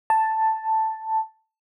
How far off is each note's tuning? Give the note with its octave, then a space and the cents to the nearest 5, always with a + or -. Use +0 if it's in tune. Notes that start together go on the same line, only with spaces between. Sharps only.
A5 +5